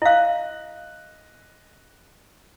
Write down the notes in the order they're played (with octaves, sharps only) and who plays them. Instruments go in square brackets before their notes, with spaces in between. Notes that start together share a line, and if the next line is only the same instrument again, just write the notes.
[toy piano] E4 F5 [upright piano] D#5 F#6